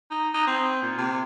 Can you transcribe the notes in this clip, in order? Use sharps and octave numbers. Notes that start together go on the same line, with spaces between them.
D#4
D#4
C4
A#2
C3